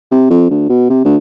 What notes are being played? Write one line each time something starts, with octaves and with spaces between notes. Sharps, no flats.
C3
F2
D2
B2
C3
D2